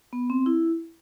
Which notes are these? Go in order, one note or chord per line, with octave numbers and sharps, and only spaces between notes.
B3
C4
E4